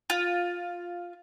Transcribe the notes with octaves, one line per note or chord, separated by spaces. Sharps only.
F4